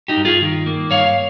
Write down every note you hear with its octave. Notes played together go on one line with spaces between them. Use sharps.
D#4 G4
G2
F4 G#4
D#3
A#3
G2 C#5 F5